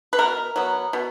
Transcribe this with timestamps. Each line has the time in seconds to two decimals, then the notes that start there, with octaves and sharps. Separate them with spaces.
0.13 B4
0.19 B2 A#4
0.56 F#3 B3
0.93 B2